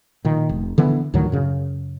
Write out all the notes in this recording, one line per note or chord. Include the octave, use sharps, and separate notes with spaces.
A#2 D#3
F1
D3 E3 B3
D2 A2 D#3 F#3
F#2 C#3